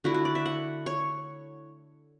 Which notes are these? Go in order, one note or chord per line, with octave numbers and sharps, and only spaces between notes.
D3 A3 E4 F#4
F#4
D5
E5
F#5
C#5